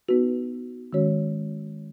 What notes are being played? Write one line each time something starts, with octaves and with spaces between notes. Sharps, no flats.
B3 D#4 F#4 B4
D#3 G#3 C#4 F#4 C#5